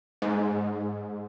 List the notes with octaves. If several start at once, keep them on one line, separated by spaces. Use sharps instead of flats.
G#2